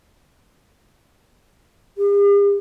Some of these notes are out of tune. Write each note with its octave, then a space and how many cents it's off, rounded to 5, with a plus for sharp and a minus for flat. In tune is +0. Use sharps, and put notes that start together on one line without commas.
G4 +45